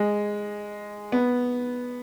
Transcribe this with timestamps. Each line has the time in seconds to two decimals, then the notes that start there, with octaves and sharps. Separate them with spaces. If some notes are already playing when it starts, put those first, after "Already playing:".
Already playing: G#3
1.12 B3